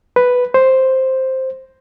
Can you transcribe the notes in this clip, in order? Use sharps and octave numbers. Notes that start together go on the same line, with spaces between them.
B4
C5